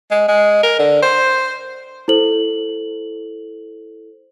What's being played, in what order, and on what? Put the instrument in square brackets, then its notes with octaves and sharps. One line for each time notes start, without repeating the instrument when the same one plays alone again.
[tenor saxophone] G#3
G#3
A#4
D3
C5
[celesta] E4 A4 C5 F#7